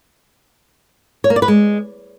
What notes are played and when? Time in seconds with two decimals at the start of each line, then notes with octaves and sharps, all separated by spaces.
1.24 C#5
1.30 A#3
1.36 D5
1.42 B4
1.48 G#3